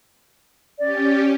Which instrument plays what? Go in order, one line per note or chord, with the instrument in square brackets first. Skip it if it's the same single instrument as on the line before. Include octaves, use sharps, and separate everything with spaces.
[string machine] C#4 G4 [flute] D5